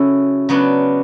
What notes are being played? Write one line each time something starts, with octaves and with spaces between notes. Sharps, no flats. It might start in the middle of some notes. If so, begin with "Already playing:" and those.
Already playing: C#3 F#3 C#4 E4 A4
C#3 F#3 B3 D4